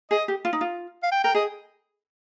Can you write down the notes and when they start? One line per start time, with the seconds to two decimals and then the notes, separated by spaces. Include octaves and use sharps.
0.11 G#4 D#5
0.28 G4
0.45 F4
0.53 D#4
0.61 F4
1.03 F5
1.12 G5
1.24 A#4 G5
1.35 G#4 D#5